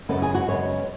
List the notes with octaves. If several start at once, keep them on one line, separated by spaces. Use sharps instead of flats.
F#2 C#3 G#3 B3 A4
G#4
F#4
F#2 C#3 G#3 B3 C#5